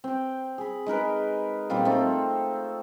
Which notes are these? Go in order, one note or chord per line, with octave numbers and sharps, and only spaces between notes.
C4 G5
G#4 B5
G#3 D#4 A#4 B4
A#2 G3 C4 F4
A3 C4 D#4 A4